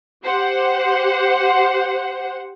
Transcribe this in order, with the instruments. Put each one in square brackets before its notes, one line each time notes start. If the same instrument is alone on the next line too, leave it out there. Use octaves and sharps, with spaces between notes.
[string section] G4 C5 F#5